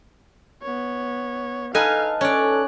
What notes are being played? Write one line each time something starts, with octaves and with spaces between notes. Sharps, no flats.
B3 C#5
D#4 A4 B4 F5 G#5 F6
C#4 D5 F#6